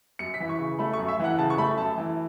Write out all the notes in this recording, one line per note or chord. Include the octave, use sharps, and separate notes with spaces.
F#2 C#7
B6
E3
C#6
C#3
A3 B5
C#6
F#2
E5
E3 F#5
C#3 A5
C#6
A3 B5
F#2 A5
E3